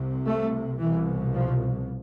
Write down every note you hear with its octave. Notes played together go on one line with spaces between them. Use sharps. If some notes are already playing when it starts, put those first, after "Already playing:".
Already playing: C2 C3
A3
C2 B2 E3
F3